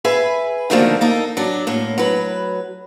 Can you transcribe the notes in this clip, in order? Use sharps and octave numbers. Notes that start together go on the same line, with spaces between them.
G#4 B4 E5 G#5
B2 D3 D#3 F3 A3 A#3
A#3 D#4 A4
F#3 D4
A2 A#3
F#3 B4